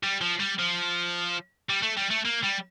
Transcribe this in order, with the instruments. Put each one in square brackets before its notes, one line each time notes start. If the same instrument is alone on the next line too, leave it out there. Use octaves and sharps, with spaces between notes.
[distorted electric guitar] G3
F3
G3
F3
G3
A3
G3
A3
A#3
G3